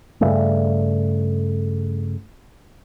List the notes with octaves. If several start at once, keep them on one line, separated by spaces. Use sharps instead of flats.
G2 C#3 G3 A3